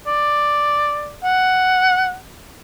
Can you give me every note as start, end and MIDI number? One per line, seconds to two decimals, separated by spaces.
0.06 1.13 74
1.24 2.15 78